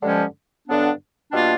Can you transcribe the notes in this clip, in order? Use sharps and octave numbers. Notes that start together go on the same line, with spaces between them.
G2 D3 F3 G#3 C#4
G2 D3 F#3 B3 D4
B2 G3 A#3 D4 F4